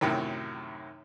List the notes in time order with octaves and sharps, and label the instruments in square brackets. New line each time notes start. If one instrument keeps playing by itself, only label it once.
[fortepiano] F#2 A2 C3 D#3 F#3